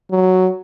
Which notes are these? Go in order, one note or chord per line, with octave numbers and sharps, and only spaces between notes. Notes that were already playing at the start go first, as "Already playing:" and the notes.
F#3